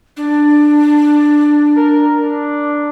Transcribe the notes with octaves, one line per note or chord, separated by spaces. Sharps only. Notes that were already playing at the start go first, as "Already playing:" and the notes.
D4
A#4
D4